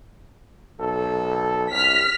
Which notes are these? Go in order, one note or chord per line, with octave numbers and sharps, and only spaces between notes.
B1 A4
C2 F6 B6